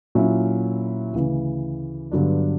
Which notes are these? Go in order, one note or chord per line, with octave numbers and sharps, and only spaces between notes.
A#2 F#3 C#4 E4
D2 C#3 E3
G2 D3 F#3 B3 D4